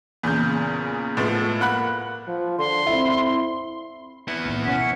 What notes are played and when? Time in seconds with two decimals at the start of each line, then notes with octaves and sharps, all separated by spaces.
0.23 E2 A#2 C#3 G6
1.17 A2 F3 G#3 A3 B3
1.60 A#3 F#5 B5 F#6
2.28 F3
2.59 D3 C6
2.87 C4 E4 E5
4.28 B3 E4
4.46 A2 D#3 A#3
4.66 B2 F3 C#4 F#5 B6
4.80 C#7